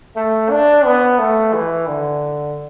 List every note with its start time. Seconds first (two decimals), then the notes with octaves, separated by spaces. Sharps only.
0.16 A3
0.50 D4
0.85 B3
1.19 A3
1.53 E3
1.87 D3